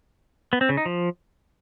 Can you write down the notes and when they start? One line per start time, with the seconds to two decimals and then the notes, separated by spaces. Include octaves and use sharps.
0.53 B3
0.61 C4
0.69 C#3
0.77 D#4
0.86 F3